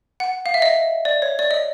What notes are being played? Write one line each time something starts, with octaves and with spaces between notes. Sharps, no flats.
F#5
F5
E5
D#5
D5
C#5
D5
D#5